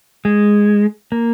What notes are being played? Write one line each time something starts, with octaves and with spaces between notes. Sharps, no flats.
G#3
A#3